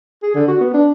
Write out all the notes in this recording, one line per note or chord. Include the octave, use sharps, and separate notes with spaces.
G#4
D3
F#4
B3
D4